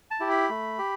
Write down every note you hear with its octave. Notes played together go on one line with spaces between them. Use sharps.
A5
E4 G4
B5
A3
G4